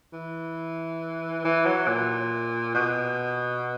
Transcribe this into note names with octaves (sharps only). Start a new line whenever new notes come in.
E3
E3
F#3
A#2
B2